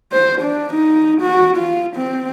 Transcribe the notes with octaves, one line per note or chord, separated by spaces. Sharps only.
C5
D4
D#4
F#4
F4
C4